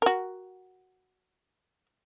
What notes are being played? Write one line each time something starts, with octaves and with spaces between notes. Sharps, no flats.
F#4 A#4